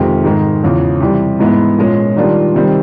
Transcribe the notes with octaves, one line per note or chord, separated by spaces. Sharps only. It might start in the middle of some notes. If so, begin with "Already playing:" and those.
Already playing: F2 C3 D#3 G#3
G#2 D#3 G#3
E2 C#3 F3
C3 E3 G3
G#2 E3 G#3 B3 E4
A#2 F3 G#3 C#4
D#3 G3 A#3 D4 F4
C3 D#3 G3 C4